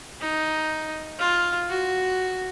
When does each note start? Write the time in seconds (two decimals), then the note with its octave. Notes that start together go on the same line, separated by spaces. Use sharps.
0.21 D#4
1.19 F4
1.70 F#4